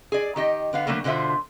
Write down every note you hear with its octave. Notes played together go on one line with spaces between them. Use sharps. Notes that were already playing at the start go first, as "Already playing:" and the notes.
G#4 D5
D#3 G4 D#5
D3 B3 F5
D3 F#3 G3 A3 A#3
B2 D3 F4 C5 E5